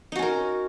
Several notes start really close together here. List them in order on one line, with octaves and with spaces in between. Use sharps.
D#4 F#4 C#4 A#4